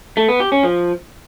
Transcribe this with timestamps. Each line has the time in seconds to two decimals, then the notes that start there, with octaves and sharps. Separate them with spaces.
0.17 A3
0.29 B3
0.40 G4
0.52 C#4
0.63 F3